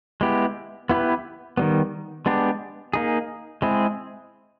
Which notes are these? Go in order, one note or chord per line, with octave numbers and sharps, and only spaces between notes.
G#3 B3 E4 G4
B3 E4 G4 B4
D#3 G3 B3
G#3 B3 D4 G4
A#3 D#4 G#4
G#3 C4 E4 G#4